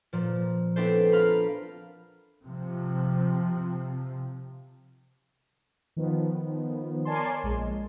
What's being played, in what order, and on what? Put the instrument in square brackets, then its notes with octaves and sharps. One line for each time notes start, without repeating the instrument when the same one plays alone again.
[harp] A#2 F3
B3 C4 D4 E4 A4 C5
F4 A#4 F5 B5
[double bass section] C3 F3
[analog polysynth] D#3 F3 B3
A#4 C#5 D5 G#5 A5 C6
A#1 G#3